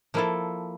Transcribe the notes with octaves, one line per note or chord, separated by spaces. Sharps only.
F3 A#3 E4 A4